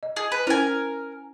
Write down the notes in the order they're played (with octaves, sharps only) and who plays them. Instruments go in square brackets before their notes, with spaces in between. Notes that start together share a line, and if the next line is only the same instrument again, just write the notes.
[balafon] D#5
[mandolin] G#4
B4
[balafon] C#4 E4 C5 [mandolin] A#4 G#5